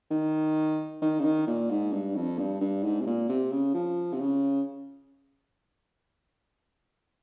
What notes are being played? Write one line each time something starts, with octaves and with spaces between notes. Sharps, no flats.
D#3
D#3
C#3
D#3
A#2
G#2
G2
F2
G2
G2
G#2
C3
A#2
C3
C#3
F3
C3
C#3